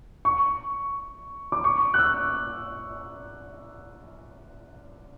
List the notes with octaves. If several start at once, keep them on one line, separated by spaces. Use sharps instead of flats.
C#6
D6
C#6
F#6
E6